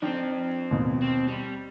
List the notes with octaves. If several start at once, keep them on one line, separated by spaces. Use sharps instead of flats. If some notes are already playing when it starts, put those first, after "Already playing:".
F3 C4 D4 D#4 G5
D#2 B2
C4
G3